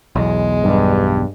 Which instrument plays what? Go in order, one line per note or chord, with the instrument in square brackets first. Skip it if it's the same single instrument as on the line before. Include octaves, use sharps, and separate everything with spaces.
[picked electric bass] B1 E2 [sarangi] G#3
[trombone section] G2